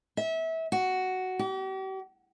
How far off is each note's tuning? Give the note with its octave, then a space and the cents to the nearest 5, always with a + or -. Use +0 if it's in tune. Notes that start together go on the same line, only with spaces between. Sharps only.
E5 -25
F#4 +5
G4 -45